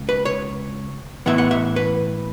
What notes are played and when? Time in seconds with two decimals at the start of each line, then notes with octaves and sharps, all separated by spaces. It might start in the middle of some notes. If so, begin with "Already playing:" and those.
Already playing: C#2
0.09 B4
0.25 C#5
1.26 A2 E3 B3 E5
1.38 F#5
1.51 E5
1.76 B4